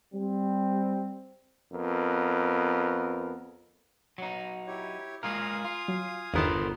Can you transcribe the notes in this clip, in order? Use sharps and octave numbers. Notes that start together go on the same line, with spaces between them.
G3 C4
F2 B3 A#4
F#3 D#4
E4 G4 C#5
G#3 F4 A#4 F5 G#5 D#6
F4
F#3
G1 E2 D3 D#3 B3 A#4 C5 A5